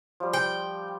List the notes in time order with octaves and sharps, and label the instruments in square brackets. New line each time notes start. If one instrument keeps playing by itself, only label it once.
[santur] F3 G3
[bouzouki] G5